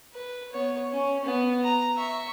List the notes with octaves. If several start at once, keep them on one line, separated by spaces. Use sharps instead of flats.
B4
B3 C#5
C#4
B3
A#5
E5 C#6